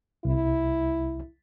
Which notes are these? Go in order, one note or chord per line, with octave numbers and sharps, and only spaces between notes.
C2 E4